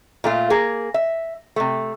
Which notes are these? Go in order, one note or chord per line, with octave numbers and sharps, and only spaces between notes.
A#2 A3 F4
A#3 G#4
E5
C3 A3